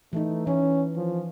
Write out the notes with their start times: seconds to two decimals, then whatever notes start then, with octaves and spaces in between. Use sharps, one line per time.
0.13 E3 A3 D#4
0.47 E3 C#4
0.97 F3